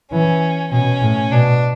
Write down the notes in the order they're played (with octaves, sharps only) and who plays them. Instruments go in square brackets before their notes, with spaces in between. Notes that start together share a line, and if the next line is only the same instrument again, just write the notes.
[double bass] E3 [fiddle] C#4
[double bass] B2 [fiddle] C#4
[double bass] A2
[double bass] B2 [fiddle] D4